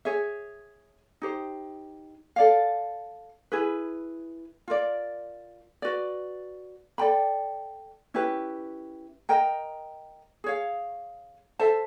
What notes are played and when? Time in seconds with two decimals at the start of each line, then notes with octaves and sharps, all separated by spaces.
0.05 G#4 C#5 E5
1.22 D#4 G4 C5
2.36 A4 D5 F5
3.52 E4 G#4 B4
4.68 F4 A#4 D5
5.82 F#4 B4 D5
6.98 A4 D5 G5 B5
8.14 C#4 E4 G4 B4
9.29 A#4 D#5 G5 A#5
10.44 G#4 C#5 F5
11.59 A4 C5 E5 A5